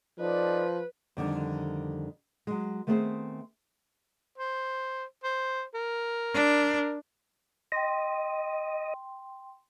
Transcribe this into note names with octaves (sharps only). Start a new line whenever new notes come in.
F3 D#4 A4 B4 D5
F2 D3 D#3 G3
F#3 G#3
D#3 A3 B3 C4 G#4 C5
C5
C5
A#4
D4
D#5 G5 C6